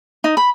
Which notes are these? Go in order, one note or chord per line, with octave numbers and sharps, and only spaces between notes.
D#4
B5